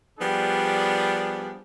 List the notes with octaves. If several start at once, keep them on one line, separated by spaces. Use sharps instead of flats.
F3 G3 B3 D4 G#4